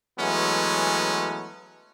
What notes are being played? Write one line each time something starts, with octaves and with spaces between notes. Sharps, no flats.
E3 F#3 G#3 A3 B3 C#4